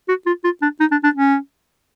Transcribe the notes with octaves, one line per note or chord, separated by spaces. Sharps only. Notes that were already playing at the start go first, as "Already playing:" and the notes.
F#4
F4
F4
D4
D#4
D4
D4
C#4